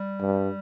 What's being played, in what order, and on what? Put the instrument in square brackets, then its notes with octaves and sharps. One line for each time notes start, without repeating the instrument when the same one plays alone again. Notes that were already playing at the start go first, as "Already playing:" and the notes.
Already playing: [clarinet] G3
[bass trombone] G2